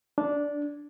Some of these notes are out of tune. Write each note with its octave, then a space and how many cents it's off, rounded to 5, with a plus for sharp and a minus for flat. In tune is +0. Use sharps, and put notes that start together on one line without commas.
D4 -10